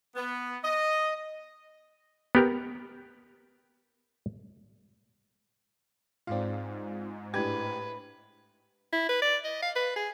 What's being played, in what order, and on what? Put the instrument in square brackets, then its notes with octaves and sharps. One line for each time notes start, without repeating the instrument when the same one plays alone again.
[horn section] B3
D#5
[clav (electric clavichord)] B3 G4 A#4
[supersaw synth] G#2 [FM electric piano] C4 F4 [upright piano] D5 F5
[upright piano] A2 D4 G#6 [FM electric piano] G4 [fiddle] B4
[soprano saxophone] E4
B4
D5
D#5
F5
B4
G#4